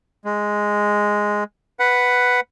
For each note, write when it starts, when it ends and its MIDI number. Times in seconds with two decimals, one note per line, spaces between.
0.25 1.44 56
1.79 2.40 71
1.79 2.40 78